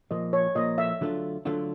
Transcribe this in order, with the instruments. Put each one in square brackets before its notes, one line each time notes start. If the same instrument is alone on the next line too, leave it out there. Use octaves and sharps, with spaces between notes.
[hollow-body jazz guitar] A#2 F3 A#3 [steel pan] D#5
[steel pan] C#5
[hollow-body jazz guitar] A#2 F3 A#3 [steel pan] D#5
[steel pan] E5
[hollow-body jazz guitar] D3 F#3 A3 D4 F4
D3 F#3 A3 D4 F4